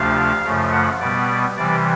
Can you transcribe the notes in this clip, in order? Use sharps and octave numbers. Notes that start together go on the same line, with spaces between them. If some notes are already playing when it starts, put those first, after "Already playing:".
Already playing: D2 C3 F3 A3 D4 F5
F#2 C#3 F3 A3
F#5
B2 G3 B3 D5
C3 E3 G3 D5